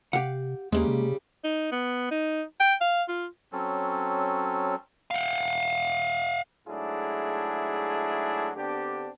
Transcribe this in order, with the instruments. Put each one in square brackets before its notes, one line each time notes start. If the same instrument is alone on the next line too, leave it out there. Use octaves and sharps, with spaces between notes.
[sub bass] C3 [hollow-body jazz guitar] G4 F5 F#5
[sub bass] D#2 [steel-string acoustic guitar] C#3 G3 [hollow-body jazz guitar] G#3 A#3
[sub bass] C3
[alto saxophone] D#4
B3
D#4
G5
F5
F4
[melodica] F#3 C4 C#4 A4
[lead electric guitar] F5 F#5
[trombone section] G#2 F#3 A3 D4 E4 G#4
D3 B3 C4 D4 G4